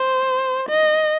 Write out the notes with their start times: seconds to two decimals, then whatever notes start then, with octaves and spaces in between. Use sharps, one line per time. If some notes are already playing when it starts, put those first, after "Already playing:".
Already playing: C5
0.69 D#5